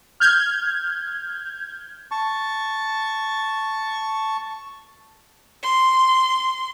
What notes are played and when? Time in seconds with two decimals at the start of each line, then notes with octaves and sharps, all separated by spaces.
0.20 F6 G6 G#6
2.11 A5 C#6
5.63 C6